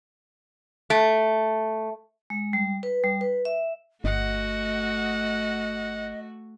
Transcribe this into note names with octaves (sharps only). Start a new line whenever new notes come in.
A3
G#3
G3
B4
G3
B4
E5
G1 A3 F#4 D#5 F#5